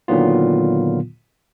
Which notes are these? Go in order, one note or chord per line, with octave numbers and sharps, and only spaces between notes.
A#2 D3 D#3 F#3 B3 F4